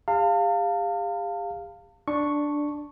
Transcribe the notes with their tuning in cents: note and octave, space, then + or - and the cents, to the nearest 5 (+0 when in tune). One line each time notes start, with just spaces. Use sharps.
G4 +45 F5 +0 A5 +40
D4 +0 C#6 +0